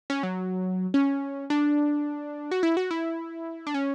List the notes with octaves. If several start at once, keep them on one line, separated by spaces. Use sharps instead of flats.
C#4
F#3
C#4
D4
F#4
E4
F#4
E4
D4
C#4